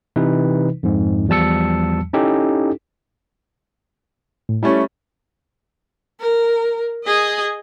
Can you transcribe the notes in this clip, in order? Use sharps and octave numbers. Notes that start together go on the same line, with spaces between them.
C3 E3 D#4 B4
F2 G#2
E2 F3 G3 A5 E6 C#7
C#4 D#4 E4 G4 A4
A2
G3 A3 C#4 E4
A#4
G#4 D#5